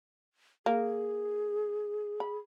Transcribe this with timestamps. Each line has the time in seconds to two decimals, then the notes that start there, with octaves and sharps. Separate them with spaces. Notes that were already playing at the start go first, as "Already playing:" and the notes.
0.66 A#3 G#4
2.20 B5